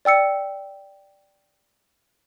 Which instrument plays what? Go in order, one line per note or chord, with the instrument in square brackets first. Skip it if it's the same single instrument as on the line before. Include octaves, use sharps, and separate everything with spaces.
[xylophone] D5 G5 E6 C#7